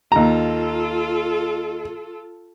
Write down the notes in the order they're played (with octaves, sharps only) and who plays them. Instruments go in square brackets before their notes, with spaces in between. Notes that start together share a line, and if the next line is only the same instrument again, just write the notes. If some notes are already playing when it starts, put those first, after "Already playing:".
[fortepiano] D#2 A#5 [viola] F4 A4